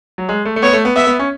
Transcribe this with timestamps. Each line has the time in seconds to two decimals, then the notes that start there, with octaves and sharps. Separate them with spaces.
0.18 F#3
0.29 G#3
0.45 A3
0.56 A3
0.63 B3 C#5
0.73 A3
0.85 B3
0.96 B3 E5
1.07 B3
1.19 C#4